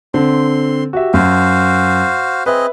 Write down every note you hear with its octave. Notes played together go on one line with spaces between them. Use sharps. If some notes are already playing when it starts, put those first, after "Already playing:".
D3 C4 C6
F#4 G4 E5
F#2 F#4 C5 F5
C4 G#4 B4 D#5 E5